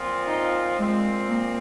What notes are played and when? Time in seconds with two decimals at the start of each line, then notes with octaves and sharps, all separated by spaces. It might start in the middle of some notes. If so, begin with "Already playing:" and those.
Already playing: A#2 F3 C4 F4
0.28 D#4
0.77 A#2 F3 G#3 C4
1.28 A#3